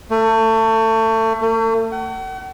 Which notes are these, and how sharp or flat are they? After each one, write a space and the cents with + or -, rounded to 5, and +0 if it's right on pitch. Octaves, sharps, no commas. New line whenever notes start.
A3 +25
A3 +40
F#5 +40